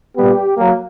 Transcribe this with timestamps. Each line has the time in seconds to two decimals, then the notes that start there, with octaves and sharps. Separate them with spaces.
0.17 A#2 G3 B3 G4
0.58 F#3 A#3